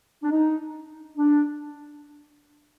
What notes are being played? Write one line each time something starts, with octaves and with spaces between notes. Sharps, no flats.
D4
D#4
D4